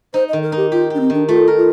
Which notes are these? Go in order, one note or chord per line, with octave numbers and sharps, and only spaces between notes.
D#4 C5
D#3 D#5
A#4
D#4 G4
F4 G4
D4 G4
C4
D#3 D4
A3 F4
A#4
F4